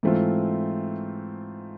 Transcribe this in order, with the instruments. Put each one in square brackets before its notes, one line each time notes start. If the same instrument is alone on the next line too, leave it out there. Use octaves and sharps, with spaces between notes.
[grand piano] G#2 E3 A3 C4 F4